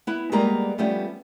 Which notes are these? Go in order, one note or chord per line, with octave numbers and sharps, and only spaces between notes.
B3 E4
G3 G#3 A#3 B3 B4 A#5
F3 G3 A3 B3 C#4